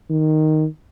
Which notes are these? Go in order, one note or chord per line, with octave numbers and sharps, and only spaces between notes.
D#3